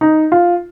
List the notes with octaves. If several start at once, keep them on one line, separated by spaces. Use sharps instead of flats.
D#4
F4